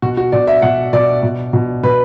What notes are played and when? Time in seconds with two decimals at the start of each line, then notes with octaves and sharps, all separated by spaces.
0.02 B2 F#4
0.17 F#4
0.32 B2 D5
0.47 E5
0.62 B2 F#5
0.93 B2 D5
1.23 B2
1.53 B2
1.83 B2 B4